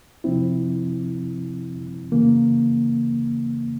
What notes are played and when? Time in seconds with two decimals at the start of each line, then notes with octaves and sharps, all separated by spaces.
0.24 C3 F3 C4 E4
2.12 C#3 E3 A#3